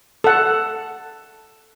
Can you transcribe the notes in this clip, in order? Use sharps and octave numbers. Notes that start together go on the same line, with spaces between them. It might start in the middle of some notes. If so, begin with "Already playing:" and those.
A4 F#5